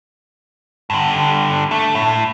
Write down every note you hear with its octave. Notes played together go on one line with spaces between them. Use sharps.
G2 D3
A3
A2